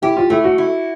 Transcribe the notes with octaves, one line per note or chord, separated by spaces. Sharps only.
E4 G4
F4
A3 E4
F#4
E4